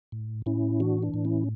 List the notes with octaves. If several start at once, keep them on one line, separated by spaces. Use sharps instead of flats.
A2
A2 C#4 E4
E3 D4 F#4
D4
A2
C#4 E4